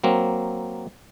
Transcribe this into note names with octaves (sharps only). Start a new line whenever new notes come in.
F#3 A#3 C4